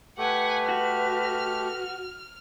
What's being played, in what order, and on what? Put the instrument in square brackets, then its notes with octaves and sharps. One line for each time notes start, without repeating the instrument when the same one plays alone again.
[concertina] A3 G4 [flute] B4 [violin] F#5 G#5
[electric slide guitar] F#4 [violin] F6